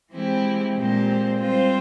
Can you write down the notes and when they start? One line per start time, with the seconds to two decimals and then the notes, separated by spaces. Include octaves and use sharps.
0.11 E3 G#3 C4 E4 G4
0.75 A#2 G#3 C4 G4 C5
1.40 G3 C4 F4 C5